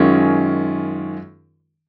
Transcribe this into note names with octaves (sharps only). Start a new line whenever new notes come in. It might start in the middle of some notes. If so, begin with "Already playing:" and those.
Already playing: F#2 D#3 G#3 C#4 F4